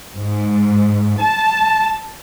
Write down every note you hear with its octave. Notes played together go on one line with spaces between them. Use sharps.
G#2
A5